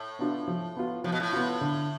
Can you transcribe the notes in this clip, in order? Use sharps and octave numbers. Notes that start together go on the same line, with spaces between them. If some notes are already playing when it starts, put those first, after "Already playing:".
Already playing: A2
B3 D4 F4
F3
B3 F4
A2 F3
B2
A2
B3 F4
D3